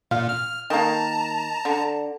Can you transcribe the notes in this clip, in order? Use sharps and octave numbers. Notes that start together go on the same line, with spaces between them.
A#2 F5
F6
D#3 A#3 A5 A#5
D3